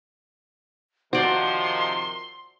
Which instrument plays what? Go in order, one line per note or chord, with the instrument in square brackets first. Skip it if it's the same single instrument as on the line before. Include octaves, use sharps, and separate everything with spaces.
[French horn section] C3 D#3 F3 [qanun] F#4 D5 [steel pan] C5 [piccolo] C6